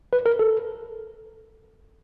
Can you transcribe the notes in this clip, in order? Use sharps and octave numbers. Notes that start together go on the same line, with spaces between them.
B4
A#4
A4